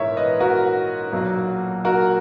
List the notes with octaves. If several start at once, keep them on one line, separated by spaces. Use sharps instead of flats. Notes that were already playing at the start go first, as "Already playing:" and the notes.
Already playing: A#1 G#2 E3 G#3 A#4 C#5 E5
B4 D#5
F#4 A#4
B1 A#2 F#3 A#3
F#4 A#4